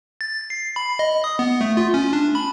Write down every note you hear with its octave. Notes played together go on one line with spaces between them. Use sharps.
A6
C7
B5
D#5
D#6
B3
A3
F4
C#4
D4
B5